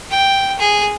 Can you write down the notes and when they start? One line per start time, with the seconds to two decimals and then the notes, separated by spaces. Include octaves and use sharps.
0.11 G5
0.59 G#4